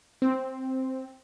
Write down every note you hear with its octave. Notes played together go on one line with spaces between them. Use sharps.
C4